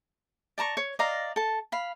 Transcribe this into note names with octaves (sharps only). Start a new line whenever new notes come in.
D5 A5 A#5 C#6
C#5
D5 D#5 F5 A#5
A4 A5
F5 B5